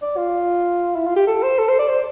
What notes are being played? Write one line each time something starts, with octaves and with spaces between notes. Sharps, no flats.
D5
F4
E4
F4
G4
A4
C5
A4
C5
D5
C5